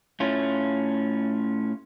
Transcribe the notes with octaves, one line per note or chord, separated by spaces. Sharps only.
A2 A3 C#4 F4